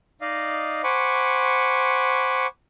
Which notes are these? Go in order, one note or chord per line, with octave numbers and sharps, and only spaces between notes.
D#4 D5 D#5 F5
C5 F#5 G#5 B5 C#6 D6